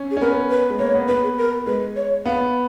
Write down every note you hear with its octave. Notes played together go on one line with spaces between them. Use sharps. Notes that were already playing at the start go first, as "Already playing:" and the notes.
Already playing: C#4
G#4
C#4
B3 A#4
B4
G#3
A#3 C#5
B3
B3 B4
G#4
A#4
G#3 B4
C#5
B3 F5